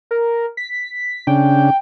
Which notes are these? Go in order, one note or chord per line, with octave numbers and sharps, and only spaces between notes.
A#4
B6
C#3 D4 G5